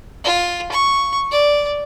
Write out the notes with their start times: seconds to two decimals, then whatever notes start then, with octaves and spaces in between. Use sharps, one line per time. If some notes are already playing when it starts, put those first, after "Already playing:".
0.25 F4
0.72 C#6
1.32 D5